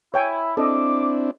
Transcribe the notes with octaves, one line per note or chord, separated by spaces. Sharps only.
E4 C#5 G5 G#5
C4 D4 E4 A4 D#5 D6